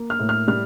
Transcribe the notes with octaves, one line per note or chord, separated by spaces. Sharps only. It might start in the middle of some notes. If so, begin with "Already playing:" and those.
Already playing: A#3
F6
A2
F6
G3 F6